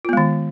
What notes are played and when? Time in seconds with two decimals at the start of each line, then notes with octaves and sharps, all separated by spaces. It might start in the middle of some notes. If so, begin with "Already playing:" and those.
0.05 F4
0.09 B3
0.13 G#3
0.17 D#3